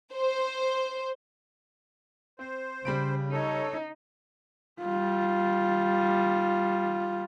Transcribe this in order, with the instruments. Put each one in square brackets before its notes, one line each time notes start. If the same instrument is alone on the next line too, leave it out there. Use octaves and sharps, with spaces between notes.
[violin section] C5
[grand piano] C4 [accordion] C5
[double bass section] C#3 [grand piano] G3 B5 D7
[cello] D#4 [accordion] A4 C#5
[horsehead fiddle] G3 F4